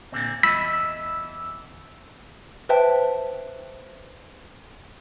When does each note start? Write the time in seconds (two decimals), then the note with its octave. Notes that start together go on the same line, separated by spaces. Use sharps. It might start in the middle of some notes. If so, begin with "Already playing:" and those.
0.12 A#2 D3 C4
0.43 E2 D#5 B5 E6 B6
2.69 B4 C5 E5 G5 A5